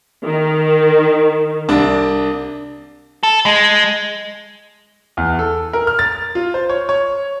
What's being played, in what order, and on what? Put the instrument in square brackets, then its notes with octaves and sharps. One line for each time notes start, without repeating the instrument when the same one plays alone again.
[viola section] D#3
[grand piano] C2 D4
[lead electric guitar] A4
G#3
[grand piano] E2
A4
A#4
F6
A6
F4
C5
C#5
C#5